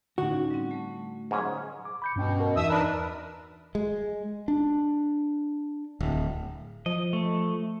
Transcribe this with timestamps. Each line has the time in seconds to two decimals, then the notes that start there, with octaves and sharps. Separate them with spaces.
0.18 A2 D3 C#4 D#4 F#4
0.51 G3 C4
0.71 A3
1.31 G#2 F#3 C#4 G#4
1.85 D6
2.02 B5 G6 C#7
2.16 G2 B2 C#4 G5
2.40 A#4
2.56 E2 E3 D#4 E5 D#6 E6
2.69 D4 A#4 B4
3.75 G#3
4.48 D4
6.00 D1
6.86 F3 D#5
7.13 A3